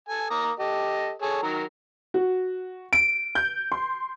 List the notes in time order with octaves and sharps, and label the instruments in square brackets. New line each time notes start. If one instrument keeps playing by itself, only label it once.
[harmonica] A4 G#5
A#3 A#5 D#6
G4 A4 D#5
G#4 A4 C#5
D#3 F#3 A#4
[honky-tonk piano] F#4
D7
G6
C6